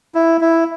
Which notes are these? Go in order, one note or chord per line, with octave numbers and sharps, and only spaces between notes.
E4
E4